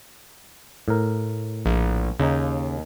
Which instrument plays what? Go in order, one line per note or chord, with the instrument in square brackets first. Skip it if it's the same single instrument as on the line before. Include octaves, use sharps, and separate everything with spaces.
[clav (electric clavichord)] A2 A#4
[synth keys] A#1
[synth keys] D#2 [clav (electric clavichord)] C#3 D#4